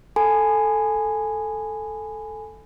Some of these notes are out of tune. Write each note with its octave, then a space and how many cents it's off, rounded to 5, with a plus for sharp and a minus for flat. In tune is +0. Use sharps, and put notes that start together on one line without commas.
A4 +0 G#5 +0 B5 +25